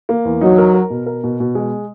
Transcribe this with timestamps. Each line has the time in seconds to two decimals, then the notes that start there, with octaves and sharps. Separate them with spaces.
0.09 A#3
0.25 E2
0.41 F#3 D#4
0.58 A#4
0.74 A#4
0.90 B2
1.06 A#4
1.24 B2
1.40 B2
1.55 G#3